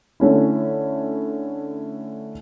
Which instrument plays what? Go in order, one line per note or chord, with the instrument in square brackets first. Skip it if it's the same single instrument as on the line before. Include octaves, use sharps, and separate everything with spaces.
[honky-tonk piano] D3 A3 C#4 E4